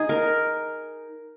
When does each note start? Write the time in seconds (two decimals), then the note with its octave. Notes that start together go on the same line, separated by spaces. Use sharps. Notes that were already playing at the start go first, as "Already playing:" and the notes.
Already playing: D#4 G#4
0.09 A#4